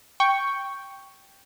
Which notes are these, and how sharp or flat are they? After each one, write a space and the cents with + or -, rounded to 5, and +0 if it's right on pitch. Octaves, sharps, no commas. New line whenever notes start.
G5 +0 C#6 +0